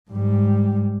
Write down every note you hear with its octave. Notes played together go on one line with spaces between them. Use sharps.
G#2 G3